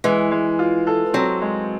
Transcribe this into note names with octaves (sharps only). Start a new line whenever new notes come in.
E3 G#3
G#3
F4
A4
F#3 C4
G#3